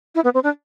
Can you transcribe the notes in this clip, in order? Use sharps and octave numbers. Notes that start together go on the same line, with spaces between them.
E4
B3
C4
D4